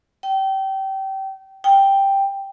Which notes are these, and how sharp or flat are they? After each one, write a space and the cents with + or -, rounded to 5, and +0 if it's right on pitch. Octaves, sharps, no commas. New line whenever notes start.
G5 -25
G5 +5